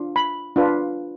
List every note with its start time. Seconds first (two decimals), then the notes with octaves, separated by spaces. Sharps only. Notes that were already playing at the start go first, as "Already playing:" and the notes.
Already playing: D4 F4
0.16 B5
0.56 D4 F4 B4